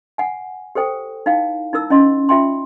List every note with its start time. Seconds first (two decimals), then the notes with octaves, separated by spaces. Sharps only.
0.18 F#5 G#5
0.75 G4 A4 C5 G5
1.26 D#4 E4 F5 G5
1.73 D#4 E4 A#4 E6
1.90 C#4 E4 D#5 C6
2.29 F4 E5 G5 C6